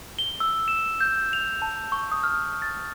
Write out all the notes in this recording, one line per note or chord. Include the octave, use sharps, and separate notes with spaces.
G7
E6
E7
G6
F7
A5
C#6
D#6
F6
A6